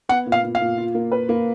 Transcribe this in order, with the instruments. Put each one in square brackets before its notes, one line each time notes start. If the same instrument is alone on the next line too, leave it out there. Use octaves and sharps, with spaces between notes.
[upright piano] B3 [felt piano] F#5
[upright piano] A#2
[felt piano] F5
[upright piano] A#2
[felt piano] F5
[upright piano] A#2
F4
A#3
B4
A#3